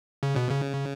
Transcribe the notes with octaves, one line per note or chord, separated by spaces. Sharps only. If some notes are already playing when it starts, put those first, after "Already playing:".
C#3
B2
C#3